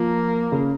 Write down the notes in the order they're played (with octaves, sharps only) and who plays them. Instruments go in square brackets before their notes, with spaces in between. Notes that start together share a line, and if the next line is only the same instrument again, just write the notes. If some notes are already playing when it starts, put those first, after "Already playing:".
Already playing: [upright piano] F3 [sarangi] A#3
[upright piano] C#3